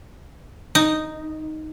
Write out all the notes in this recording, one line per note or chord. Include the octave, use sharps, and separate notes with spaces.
D#4